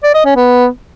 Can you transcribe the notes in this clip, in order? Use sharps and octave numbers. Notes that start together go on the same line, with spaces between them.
D5
D#5
C#4
B3